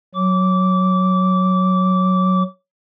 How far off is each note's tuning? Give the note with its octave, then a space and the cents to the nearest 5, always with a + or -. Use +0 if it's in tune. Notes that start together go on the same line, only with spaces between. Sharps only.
F#3 +0 D6 -15